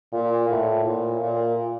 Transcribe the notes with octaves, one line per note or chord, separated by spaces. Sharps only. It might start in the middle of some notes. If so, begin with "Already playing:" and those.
A#2
A2
A#2
A#2